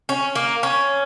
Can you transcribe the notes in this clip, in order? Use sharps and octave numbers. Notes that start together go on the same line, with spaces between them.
C#4
A#3
C#4